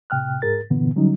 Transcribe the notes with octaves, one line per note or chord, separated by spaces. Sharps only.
A2 C3 G5 F6 F#6
G#2 G#4 A#4 A6
G2 A#2 D3 E3 B3
D3 F#3 G3 C#4 D#4